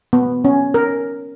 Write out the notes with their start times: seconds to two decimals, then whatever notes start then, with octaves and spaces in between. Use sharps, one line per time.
0.13 B3
0.45 C#4
0.74 A#4